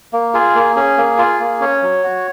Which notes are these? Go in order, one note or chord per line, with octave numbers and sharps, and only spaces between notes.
A#3
F4 G#4
A#3
C#4 G#4
A#3
F4
A#3
C#4 C#5
F#3
F#4